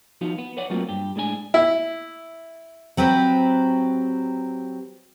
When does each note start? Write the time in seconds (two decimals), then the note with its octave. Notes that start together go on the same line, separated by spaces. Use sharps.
0.21 F3 B3 D#4 F#4 F5
0.38 B3
0.57 B4 C#5 D5 F#5
0.70 F#3 A3 A#3 C4 F4 F#4
0.89 G2 G4
1.16 A2 G#3 D4 G#4 G#5
1.54 E4
2.97 F#3 C4 G4 B4